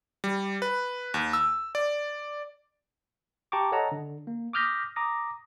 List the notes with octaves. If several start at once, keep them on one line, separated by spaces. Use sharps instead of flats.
G3
B4
D#2
E6
D5
G4 G5 A5 A#5 C#6 D6
A4 C#5 D#5 F#5 A5 A#5
D3
A#3
D6 D#6 F6 G6 A#6 B6
A#5 D6 D#6 A#6